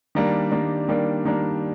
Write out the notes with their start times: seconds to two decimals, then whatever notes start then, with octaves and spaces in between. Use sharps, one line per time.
0.15 D#3 G3 A#3 D4
0.51 D#3 G3 A#3 D4
0.89 D#3 G3 A#3 D4
1.25 D#3 G3 A#3 D4